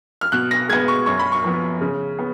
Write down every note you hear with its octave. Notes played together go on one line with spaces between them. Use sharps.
F6
B2 F#6
A#6
G#3 B3 G#6
C#6
F#2 C#6
B5
C#6
F3 B3
C#3
B3